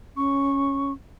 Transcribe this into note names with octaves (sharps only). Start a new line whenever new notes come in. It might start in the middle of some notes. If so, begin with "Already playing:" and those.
C#4 C#6